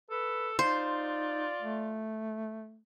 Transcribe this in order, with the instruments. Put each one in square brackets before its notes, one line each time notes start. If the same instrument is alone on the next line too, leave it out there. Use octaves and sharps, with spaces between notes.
[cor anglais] A4 [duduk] B4
[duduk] D#4 [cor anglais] F4 [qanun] C5 [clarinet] D5
[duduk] A3